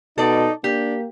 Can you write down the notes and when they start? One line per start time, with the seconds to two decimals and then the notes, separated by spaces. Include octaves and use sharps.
0.18 B2 D#4 A4 D5
0.64 A#3 D4 G4